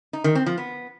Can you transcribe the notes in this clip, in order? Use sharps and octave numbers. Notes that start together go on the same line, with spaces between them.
D#4
D#3
C4
F3
B3